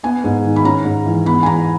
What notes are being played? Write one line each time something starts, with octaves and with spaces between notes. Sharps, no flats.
B3 G#5
G#2
D#3
B5
C#4 A#5
G#2
E3
B3 B5
G#5
E2 A#5